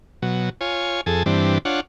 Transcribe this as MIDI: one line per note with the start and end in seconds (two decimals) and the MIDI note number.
0.22 0.50 47
0.22 0.50 54
0.61 1.01 65
0.61 1.01 73
0.61 1.01 80
1.06 1.23 41
1.06 1.23 68
1.06 1.23 69
1.26 1.58 43
1.26 1.58 52
1.26 1.58 60
1.26 1.58 62
1.65 1.80 62
1.65 1.80 65
1.65 1.80 73
1.65 1.80 78